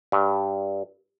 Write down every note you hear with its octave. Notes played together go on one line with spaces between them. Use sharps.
G2